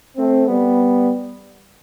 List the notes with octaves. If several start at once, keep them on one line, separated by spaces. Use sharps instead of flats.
A3 C4
G3 B3